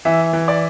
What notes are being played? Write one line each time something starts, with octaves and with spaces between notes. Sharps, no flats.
E3 E5
E3
D5